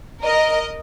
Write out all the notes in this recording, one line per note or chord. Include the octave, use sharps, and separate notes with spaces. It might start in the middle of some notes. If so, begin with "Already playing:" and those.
A#4 D#5